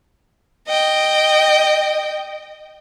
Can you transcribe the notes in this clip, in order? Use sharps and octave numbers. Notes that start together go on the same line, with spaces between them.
D#5 G5